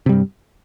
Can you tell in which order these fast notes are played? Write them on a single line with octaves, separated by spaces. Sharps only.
C3 G3 G2